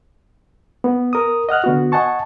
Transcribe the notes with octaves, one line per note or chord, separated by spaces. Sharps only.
B3
A#4 D#6
D#5 F#5 F6 F#6
D3 B3 F#4
D#5 F#5 G#5 A5 C#6